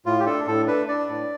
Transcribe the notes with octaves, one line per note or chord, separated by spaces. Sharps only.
A2 F4
G4
D4 A4
A2 A4
D4 B4
D4 D5
A2